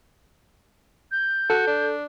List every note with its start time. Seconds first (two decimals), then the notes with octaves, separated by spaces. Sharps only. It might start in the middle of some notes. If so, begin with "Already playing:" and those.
1.12 G6
1.50 F#4 A4
1.67 D4